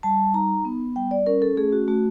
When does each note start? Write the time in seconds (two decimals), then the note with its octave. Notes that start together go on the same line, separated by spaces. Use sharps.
0.03 G3 A5
0.34 D#4 A#5
0.65 B3
0.96 G3 G5
1.11 D5
1.26 C#4 A#4
1.42 A4
1.57 A3 G#4
1.72 F#4
1.88 A3 F#4